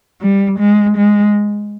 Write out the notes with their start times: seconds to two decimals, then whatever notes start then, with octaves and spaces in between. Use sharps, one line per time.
0.21 G3
0.59 G#3
0.97 G#3